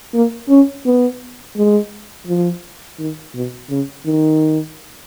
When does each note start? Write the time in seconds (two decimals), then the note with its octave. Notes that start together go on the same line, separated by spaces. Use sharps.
0.14 A#3
0.49 C#4
0.86 B3
1.57 G#3
2.27 F3
2.99 D#3
3.34 B2
3.70 C#3
4.05 D#3